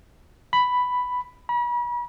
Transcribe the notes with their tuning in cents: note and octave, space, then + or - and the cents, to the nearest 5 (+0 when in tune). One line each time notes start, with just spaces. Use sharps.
B5 +5
B5 -40